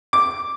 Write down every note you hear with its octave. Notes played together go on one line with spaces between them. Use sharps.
D6